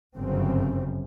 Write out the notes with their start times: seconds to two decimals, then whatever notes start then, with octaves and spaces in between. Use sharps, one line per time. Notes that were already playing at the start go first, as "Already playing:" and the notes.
0.15 G1 F#2 C#3 C4